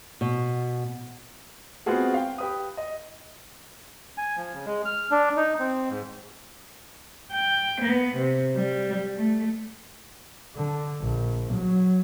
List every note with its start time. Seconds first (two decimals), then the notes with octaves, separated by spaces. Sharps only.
0.21 B2
1.86 G#3 B3 C4 F4 F#4 G#4
2.14 F5 G5
2.38 G4 B4 D#6
2.77 D#5
4.18 G#5
4.37 F3
4.54 C#3
4.66 G#3
4.85 F6
5.11 D4
5.37 D#4
5.59 C4
5.90 G#2
7.32 G5
7.81 B3
8.16 C3
8.55 G3
9.17 A3
10.56 D3
11.02 A#1
11.54 F#3